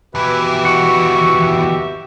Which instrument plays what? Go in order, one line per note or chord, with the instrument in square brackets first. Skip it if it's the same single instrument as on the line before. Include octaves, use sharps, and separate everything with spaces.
[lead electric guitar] D#2 E3 [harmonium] B2 G4 E5 [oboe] B4
[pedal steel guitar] F#4 [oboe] C#6